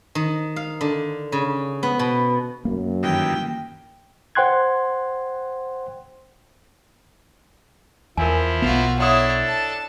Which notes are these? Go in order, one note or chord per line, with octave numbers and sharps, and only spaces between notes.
D#3
F5
D3
C#3
B3
B2
F#2 A#3
G2 D#3 E3 G5
C5 F#5 G5 C6 F#6 G#6
E2 F3 E4 A#4 G#5
B1 B3 F4 F#4
D4 E4 A4 C#5 F#5 C6 D#6
A5